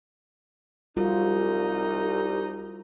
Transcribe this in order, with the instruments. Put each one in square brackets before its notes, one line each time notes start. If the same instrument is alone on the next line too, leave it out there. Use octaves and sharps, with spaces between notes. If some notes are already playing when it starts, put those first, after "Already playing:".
[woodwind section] C2 [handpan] G3 F4 F#4 [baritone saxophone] D#4